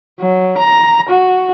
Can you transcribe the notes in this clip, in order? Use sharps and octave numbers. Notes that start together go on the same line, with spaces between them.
F#3
A#5
F#4